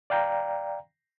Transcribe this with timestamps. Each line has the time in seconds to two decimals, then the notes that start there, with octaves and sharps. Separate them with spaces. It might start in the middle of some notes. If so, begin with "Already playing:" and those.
0.10 D5 F5 G5 A#5